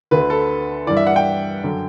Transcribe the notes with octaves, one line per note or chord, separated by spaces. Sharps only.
D2 D3 B4
A4
G2 E3 D5
E5
F#5
G5
F#2 D3